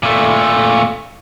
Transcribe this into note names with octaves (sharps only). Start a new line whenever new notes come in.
A#2 A3